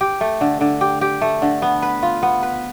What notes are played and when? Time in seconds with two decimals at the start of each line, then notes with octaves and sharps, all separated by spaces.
0.01 G4
0.21 A3
0.41 D3
0.61 D3
0.81 G4
1.01 G4
1.21 A3
1.42 D3
1.62 B3
1.82 B4
2.03 F4
2.23 B3
2.43 B4